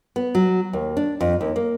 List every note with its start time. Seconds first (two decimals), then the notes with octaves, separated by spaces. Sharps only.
0.16 B3
0.35 F#3
0.73 D#2
0.97 D4
1.21 F2
1.41 D#2
1.56 A#3